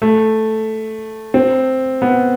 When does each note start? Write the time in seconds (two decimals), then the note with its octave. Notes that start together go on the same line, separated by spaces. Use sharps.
0.02 A3
1.34 C4
2.02 B3